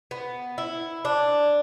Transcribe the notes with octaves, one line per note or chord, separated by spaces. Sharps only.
B3
E4
D4